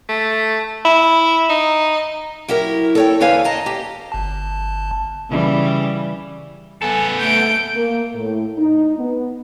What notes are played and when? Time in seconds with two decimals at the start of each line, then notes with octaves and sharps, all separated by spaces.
0.09 A3
0.85 E4
1.50 D#4
2.48 F#3 E4 G4 A#4
2.95 A4 C#5 G5
3.20 E2 D3 B4 C#5 F5 G#5
3.44 D#5 A5 A#5
3.66 G4
4.12 G1 A5
5.30 C#3 E3 G3
6.82 B3 A4 G#5
7.20 A3 G6 D7
7.75 A#3
8.15 A2
8.58 D#4
8.98 B3